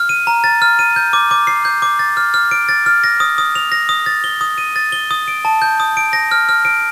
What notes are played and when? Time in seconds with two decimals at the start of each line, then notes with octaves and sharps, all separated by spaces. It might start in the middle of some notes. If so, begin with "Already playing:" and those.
Already playing: F6
0.09 D#7
0.27 A#5
0.44 A6
0.62 F6
0.79 D#7
0.96 G6
1.13 D6
1.31 D6
1.47 C7
1.65 G6
1.82 D6
1.99 A6
2.17 F6
2.34 F6
2.51 D7
2.69 A6
2.86 F6
3.04 A#6
3.20 D#6
3.38 D#6
3.55 F7
3.72 A#6
3.89 D#6
4.06 A6
4.24 G7
4.41 D#6
4.58 D#7
4.76 A6
4.92 G7
5.11 D#6
5.28 D7
5.45 A5
5.62 G6
5.80 D#6
5.97 D7
6.13 A#6
6.31 F6
6.49 F6
6.65 D7